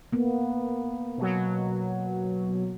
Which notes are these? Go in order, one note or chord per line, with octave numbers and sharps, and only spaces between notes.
A#3 B3
B2 F#3